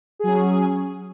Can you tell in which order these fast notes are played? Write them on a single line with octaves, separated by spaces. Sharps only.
G#4 F#3 C#4